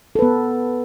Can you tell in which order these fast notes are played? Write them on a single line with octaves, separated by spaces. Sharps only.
A4 B4 B3